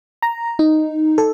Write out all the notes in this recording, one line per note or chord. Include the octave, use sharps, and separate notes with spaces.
A#5
D#4
A4